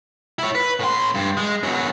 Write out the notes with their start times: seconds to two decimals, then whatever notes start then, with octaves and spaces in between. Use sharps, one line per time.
0.39 E4 C#5
0.55 B4
0.80 A2 C6
1.15 G2
1.37 G#3
1.63 E2 F#3